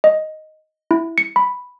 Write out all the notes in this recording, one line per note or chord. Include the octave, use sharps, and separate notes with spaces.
D#5
E4
C#7
B5